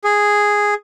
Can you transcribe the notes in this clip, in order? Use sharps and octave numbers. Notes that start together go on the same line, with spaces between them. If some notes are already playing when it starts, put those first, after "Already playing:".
G#4